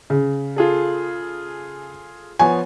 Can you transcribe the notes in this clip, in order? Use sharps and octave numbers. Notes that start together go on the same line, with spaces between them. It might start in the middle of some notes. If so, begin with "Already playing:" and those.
C#3
F4 G#4 A4
F3 B3 C#5 G#5